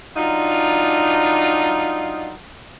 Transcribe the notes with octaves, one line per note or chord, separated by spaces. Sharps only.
F#3 D4 D#4 F4